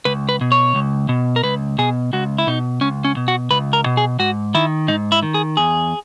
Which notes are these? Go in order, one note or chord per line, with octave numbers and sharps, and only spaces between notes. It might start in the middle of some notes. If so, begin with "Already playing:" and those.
C#2 B4
B4
B2
C#5
C#2
B2
A#4
C#2 B4
B2 G#4
C#2 F#4
E4
B2 D#4
C#2 C#4
C#4
B2
F#4
C#2 B4
A#4
B2
G#4
G#2 F#4
D#3 E4
G#2 D#4
E4
D#3
G#4
E2 G#4